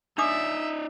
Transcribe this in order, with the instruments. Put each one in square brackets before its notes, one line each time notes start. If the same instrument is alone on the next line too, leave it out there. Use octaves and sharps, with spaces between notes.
[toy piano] D4 D6 D#6 [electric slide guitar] D#4 D5 [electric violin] E5